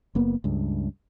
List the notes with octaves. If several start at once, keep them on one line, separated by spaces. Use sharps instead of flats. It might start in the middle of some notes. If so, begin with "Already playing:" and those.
F#1 A#3 B3
C#2 G2